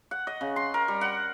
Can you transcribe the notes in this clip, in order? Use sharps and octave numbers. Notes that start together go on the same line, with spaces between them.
F#5
D#5
C#3
C6
A#4
G3
F#5